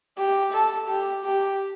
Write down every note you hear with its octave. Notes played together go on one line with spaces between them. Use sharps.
G4
A4
G4
G4